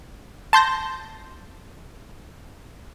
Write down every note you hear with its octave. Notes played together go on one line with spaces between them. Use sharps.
A5 C6 G6 A#6